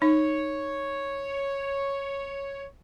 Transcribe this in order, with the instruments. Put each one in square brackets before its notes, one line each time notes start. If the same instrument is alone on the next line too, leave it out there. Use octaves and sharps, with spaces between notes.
[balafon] D#4 [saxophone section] C#5